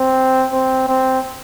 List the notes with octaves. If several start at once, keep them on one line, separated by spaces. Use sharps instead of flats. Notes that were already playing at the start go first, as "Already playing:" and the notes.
Already playing: C4
C4
C4